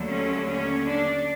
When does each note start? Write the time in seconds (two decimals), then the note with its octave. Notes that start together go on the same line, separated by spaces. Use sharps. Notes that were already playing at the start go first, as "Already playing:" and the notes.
Already playing: D#2 D3 F#3 A3
0.09 C#4
0.49 C#4
0.87 D4